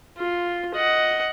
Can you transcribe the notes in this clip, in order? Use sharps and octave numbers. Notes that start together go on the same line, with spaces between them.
F4
D#5 F#5